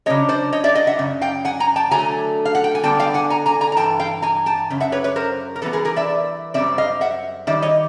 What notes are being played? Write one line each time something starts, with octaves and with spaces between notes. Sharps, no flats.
C#3 F#3 B3 D4 C#5 D#5
C5 D5
C#5 D#5
D5 E5
D#5 F5
E5 F#5
F#2 C#3
F5 G5
F#5 G#5
G#5 A#5
G5 A5
D3 F#3 A3 G#5 A#5
F5
F#5
G5
G#5
D3 G3 B3 D4 G5 A5
F5 G5
F#5 G#5
G#5 A#5
G#5 A#5
G#5 A#5
A#5
G2 E3 G5 A5
F5 G5
G#5 A#5
G5 A5
F#2 C#3
E5 F#5
B4 C#5
B4 C#5
A#4 C5
A#4
A2 E3 G3 B3 A4 B4
G#4 A#4
G#4 A#4
D5 E5
F#2 D#3 G3 C4 D5 E5
D#5 F5
E5 F#5
D#3 G3 D5 E5
C#5 D#5